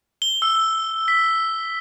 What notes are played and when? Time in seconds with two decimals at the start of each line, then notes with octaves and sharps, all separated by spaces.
0.22 G7
0.42 E6
1.08 B6